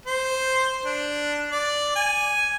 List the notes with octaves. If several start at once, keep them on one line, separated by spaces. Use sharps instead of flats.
C5
D4
D5
G#5